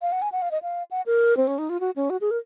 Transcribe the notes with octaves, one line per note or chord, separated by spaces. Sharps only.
F5
F#5
G#5
F#5
F5
D#5
F5
F#5
A#4
C4
C#4
D#4
F4
F#4
C#4
F#4
G#4
A#4